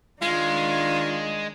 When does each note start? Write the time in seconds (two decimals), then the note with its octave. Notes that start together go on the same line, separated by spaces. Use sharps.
0.22 D#3 G#3 D4 F4